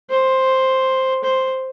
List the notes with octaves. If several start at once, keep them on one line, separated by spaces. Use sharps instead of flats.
C5
C5